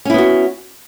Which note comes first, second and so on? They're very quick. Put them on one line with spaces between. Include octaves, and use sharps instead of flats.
C#4 E4 B3 F#4